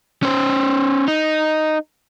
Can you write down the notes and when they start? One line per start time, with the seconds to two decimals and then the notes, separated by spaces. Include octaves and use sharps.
0.23 C#4 C5
1.08 D#4